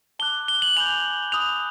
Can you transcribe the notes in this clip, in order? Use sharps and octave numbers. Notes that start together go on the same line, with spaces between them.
A5 D6 F#6 G7
G7
F#7
G#5 B5 D6 G6 F7
B5 D#6 F#6 F7